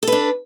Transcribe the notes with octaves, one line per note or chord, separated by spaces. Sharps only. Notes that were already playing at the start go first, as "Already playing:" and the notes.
D4 A4 B4